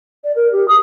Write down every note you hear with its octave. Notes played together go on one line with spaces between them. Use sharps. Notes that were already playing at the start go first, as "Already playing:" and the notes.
D5
A#4
G4
D#6